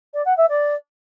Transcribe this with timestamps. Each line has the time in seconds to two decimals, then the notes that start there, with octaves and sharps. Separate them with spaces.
0.14 D5
0.25 F#5
0.37 E5
0.49 D5